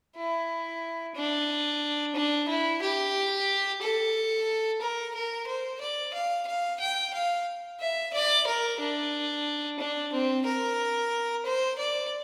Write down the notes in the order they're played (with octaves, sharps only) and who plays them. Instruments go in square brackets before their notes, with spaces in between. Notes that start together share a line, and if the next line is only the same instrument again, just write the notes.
[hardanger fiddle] E4
D4
D4
E4
G4
A4
A#4
A#4
C5
D5
F5
F5
G5
F5
E5
D5
A#4
D4
D4
C4
A#4
C5
D5